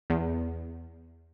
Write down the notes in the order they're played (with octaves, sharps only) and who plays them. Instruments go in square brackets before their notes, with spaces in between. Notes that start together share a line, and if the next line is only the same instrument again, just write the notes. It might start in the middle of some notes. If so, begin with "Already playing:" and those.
[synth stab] E2